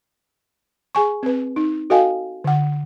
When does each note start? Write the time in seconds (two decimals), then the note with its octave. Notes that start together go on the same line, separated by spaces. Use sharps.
0.95 G#4 G#5 C#6
1.23 C4 B4
1.56 D#4
1.90 F#4 A4 D#5 F5 G5 G#5
2.44 D3 F#5